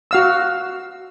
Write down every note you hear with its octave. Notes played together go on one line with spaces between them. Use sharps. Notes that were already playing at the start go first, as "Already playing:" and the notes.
F#4 F5 E6